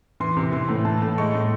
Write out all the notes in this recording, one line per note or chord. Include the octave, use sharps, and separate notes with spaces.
E3 C6
C3
E3 C6
A2
E3 A5
A2
G#3 C#6
A2